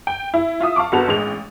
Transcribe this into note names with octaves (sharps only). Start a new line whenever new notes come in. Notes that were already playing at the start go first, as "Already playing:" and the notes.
G5
E4
F4 E5 D#6
F5 A5 C#6 D6
G1 B3 F#4 A4 F7
A1 G#3 F7